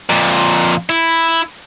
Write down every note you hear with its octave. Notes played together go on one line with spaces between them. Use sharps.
F2 A#2
E4